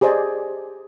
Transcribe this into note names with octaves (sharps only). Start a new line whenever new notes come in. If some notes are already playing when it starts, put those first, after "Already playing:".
G4 G#4 C5 D5 D#5